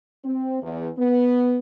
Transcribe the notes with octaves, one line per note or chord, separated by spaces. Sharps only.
C4
E2
B3